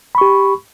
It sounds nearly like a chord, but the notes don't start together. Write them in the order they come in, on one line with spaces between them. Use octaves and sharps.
B5 C#6 G4